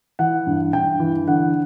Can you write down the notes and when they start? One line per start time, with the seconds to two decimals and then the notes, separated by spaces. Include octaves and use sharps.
0.19 E3 F#5
0.47 G2
0.73 G2 G5
1.00 E3
1.27 D3 F#5